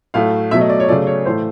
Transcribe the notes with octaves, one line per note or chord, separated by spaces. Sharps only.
A2 F#3 A3 F5
B2 F#3 A3 E5
D#5
D5
C#5
C#3 F#3 A3 D5
C#5
A2 E3 A3 C5